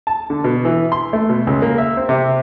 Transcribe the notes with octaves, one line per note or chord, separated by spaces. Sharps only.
A5
D3
B2
E3
C6
A3
B2
C#2
A#3
E5
C4
C3